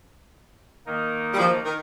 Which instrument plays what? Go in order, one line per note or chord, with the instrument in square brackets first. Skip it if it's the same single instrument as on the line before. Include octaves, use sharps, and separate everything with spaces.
[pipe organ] D#3 A#3 D#4 A#4 D#5
[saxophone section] G3
F3
D#3